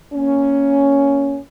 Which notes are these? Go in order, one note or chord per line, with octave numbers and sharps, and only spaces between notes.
A#3 C#4